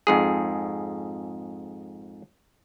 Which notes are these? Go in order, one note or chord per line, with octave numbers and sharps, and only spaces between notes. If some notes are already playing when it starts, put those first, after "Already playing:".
F2 G#2 G#4